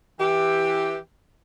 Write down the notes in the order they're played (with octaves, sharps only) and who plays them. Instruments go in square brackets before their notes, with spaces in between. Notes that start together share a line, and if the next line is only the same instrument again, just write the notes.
[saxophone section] E3 G4